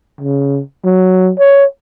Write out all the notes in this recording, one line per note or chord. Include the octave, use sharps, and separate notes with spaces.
C#3
F#3
C#5